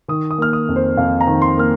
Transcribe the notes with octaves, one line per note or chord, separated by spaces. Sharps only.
D#3 D#6
D#6
A#3 F6
D#6
F2
C5
F2 F5
A#5
D#3
C6
A#3 F6